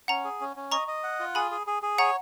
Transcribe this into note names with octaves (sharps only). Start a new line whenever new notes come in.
C#4 F#5 A#5
G#4
C#4
C#4
D#5 A#5 C#6
D#5
F#5
F4
G#4 G#5 B5
G#4
G#4
G#4
C#5 F#5 A#5